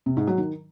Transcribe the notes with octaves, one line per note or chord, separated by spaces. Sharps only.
C3
G#2
F#3
D#3